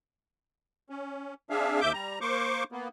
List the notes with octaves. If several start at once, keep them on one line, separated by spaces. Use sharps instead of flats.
C#4
C4 D4 G#4 E5 F5
D#2 E5 D6 G6
G3 A#5
A#3 C5 C#6 D6
A#3 B3